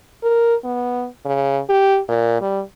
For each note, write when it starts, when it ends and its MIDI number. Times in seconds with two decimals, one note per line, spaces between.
0.23 0.55 70
0.64 1.06 59
1.25 1.60 49
1.69 1.99 67
2.09 2.40 46
2.42 2.61 55